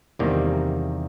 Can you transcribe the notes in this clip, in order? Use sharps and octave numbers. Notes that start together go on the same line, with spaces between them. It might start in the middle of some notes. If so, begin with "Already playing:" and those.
E2 C3 D#3 G3 A#3